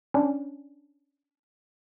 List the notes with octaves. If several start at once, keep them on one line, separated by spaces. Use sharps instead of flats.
C#4 D4